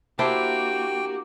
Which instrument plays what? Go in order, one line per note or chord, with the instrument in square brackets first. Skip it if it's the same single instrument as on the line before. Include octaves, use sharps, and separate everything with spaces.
[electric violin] A#3 F#4 [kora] D4 E4 C5 [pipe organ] G4 [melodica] G5